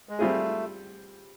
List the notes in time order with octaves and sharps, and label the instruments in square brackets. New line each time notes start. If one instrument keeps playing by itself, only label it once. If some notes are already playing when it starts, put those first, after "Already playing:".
[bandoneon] G#3
[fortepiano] G3 C4 F4 G#4 [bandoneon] A3